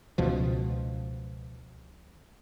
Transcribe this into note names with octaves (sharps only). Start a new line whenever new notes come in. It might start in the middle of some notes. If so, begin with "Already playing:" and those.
C#2 B2 F3